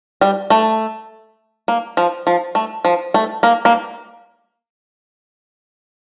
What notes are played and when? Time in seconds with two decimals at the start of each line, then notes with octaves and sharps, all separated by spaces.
0.21 G3
0.50 A3
1.68 A#3
1.97 F3
2.27 F3
2.55 A3
2.85 F3
3.14 A3
3.43 A#3
3.65 A#3